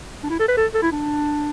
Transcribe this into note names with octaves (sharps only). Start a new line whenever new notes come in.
D4
E4
A4
B4
A4
A4
E4
D4